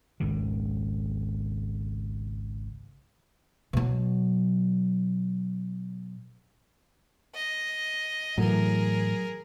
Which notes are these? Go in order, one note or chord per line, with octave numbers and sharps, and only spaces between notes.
G#1 C#2 D#3
B2 F#3
D#5
A2 E3 F#3 G#4 A#4